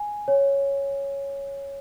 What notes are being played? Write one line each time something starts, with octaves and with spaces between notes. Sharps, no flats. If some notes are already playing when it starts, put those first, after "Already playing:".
Already playing: G#5
C#5